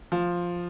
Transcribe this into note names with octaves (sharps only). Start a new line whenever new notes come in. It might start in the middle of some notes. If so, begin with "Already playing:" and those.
F3